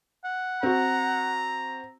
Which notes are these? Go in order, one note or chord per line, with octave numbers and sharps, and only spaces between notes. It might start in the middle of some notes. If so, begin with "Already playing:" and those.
F#5
C4 F#4 A#5